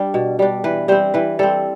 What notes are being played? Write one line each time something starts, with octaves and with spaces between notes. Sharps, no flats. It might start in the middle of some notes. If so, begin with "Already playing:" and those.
Already playing: G3 D4
B2
G3 D4
E3 B4
G3 C4 C5
E3 B4
G3 C4 A4